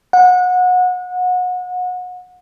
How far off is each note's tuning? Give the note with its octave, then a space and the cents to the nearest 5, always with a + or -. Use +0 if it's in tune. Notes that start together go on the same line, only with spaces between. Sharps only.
F#5 -30